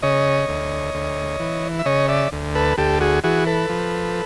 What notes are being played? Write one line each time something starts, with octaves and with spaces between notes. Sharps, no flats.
C#3 C#5 D#5
D2
D2
E3
E5
C#3 C#5 D#5
D5 E5
D2
A4 B4
D2 G4 A4
F#4 G#4
E3 F#4 G#4
A4 B4
F3